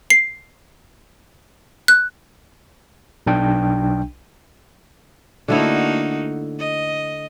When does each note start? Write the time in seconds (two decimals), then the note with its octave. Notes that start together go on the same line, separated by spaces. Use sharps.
0.10 C7
1.88 F#6
3.27 B1 D4 G5
5.48 D3 A3 A#3 D#4 E4 F#4
6.59 D#5